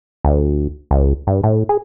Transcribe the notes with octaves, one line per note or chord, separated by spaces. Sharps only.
D2
C#2
G2
A2
G#4